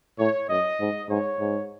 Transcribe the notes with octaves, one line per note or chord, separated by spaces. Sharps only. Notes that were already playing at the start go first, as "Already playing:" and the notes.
A2 C#5
F#2 D#5
G#2
G#2 C#5
G#2